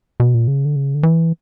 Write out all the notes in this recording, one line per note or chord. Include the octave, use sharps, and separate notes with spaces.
B2
A#2
C#3
D3
C#3
D3
E3